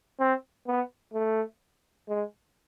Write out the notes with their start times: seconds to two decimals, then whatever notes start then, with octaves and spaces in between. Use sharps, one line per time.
0.20 C4
0.67 B3
1.14 A3
2.09 G#3